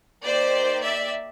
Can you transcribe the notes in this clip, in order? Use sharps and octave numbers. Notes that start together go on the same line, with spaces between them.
A#3 D#4 G4 C5 D5
D5 E5